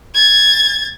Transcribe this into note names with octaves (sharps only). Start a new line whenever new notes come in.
G#6 A6